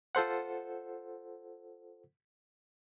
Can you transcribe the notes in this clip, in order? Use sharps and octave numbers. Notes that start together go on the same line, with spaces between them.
F4 A4 C5 F#5